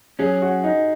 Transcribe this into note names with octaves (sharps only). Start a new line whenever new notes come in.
F#3 C#4 G#4
F#4
D#4